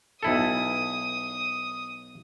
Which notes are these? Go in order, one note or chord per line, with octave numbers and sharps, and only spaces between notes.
B1 E4 A4 D#6